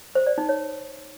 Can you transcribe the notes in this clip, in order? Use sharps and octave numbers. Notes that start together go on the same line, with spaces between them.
C5
D5
D#4
C#5